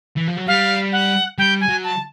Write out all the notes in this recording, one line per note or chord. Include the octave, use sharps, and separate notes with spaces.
E3
F3
F#3
G3 F5
F#5
G3 G5
G#5
F#3
A5